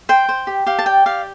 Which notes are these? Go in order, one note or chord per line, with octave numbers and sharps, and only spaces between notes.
C5 G5
C5
G4
G4 F5
A5
D5 G5
G4 F5